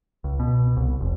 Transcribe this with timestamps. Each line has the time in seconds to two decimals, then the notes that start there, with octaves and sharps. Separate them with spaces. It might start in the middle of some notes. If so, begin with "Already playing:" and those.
0.24 C#2
0.40 B2
0.77 C2
1.01 F1